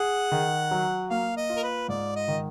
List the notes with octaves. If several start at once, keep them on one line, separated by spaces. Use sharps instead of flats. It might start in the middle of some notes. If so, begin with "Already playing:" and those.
Already playing: G#4 F#5
D#3
F#3
A#3 F5
D#5
F4
A#4
B4
G#2 D5
D#5
D#3